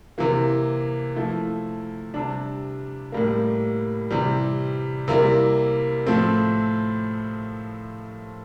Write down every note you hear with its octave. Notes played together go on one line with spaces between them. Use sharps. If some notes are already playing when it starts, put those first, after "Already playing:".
C3 E3 A#3
F3 A3 E4
C3 G3 D4
A2 G3 A#3
C3 E3 G3
C3 G3 A#3 E4
A2 F3 A3 C4